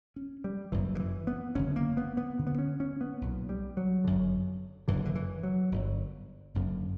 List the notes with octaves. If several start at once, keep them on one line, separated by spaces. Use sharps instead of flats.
C#4
G3
F#1 F#2 D3 E3
D3
E3
B3
F#1 E2 D3 C#4
A#3
B3
B3
D2 D3
B3
C#4
C#4
B3
B1 A#2
G3
F#3
G1 F#2 D3
F#1 F#2 D3 E3
D3
E3
F#3
G1 F#2 D3
F#1 F#2 D3